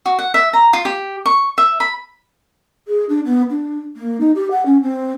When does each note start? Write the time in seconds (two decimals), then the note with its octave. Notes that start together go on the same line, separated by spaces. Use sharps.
0.06 F#4
0.19 F#5
0.34 E5
0.53 A#5
0.73 F4
0.85 G4
1.26 C#6
1.58 E5
1.80 B5
2.88 G#4
3.09 D4
3.25 B3
3.50 D4
3.97 A#3
4.20 D#4
4.36 G4
4.51 F#5
4.66 C#4
4.82 C4